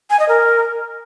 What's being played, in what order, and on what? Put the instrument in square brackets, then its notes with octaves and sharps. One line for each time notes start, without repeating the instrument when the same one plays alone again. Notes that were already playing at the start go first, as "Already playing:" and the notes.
[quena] G#5
D#5
A#4